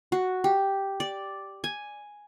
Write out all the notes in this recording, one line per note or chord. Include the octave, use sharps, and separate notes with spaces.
F#4
G4
D5
G#5